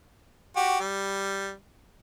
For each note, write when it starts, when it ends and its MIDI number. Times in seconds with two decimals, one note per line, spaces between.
0.56 0.79 66
0.56 0.79 67
0.80 1.53 55